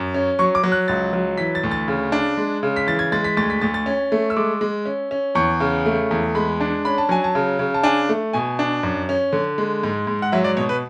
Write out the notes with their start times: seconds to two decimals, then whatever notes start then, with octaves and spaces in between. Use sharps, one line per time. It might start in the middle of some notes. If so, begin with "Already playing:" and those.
Already playing: F#2
0.14 C#4
0.39 F#3 C#6
0.55 D6
0.64 F#3
0.72 F#6
0.88 C#2 A6
1.13 F#3
1.38 E3 B6
1.55 A6
1.63 D2
1.71 A6
1.88 C#3
2.12 D4
2.37 G#3
2.63 C#3
2.76 B6
2.87 E3 A6
2.99 G#6
3.12 G#3 A6
3.24 B6
3.37 D2 A6
3.50 B6
3.61 D2 A6
3.74 A6
3.86 C#4
4.12 A3
4.30 E6
4.37 G#3 D6
4.61 G#3
4.85 C#4
5.11 C#4
5.35 E2 C#6
5.60 C#3
5.86 A3
6.11 E2
6.35 G#3 B5
6.60 D4
6.85 C#4 B5
6.98 A5
7.09 F#3 G#5
7.24 A5
7.35 C#3
7.59 C#3
7.74 A5
7.83 D4 G#5
8.09 A3
8.33 B2 G#5
8.59 D4
8.83 F#2
9.09 C#4
9.33 D3
9.58 G#3
9.83 G#2
10.07 G#2
10.22 F#5
10.32 F#3 E5
10.44 D5
10.57 B2 C#5
10.69 B4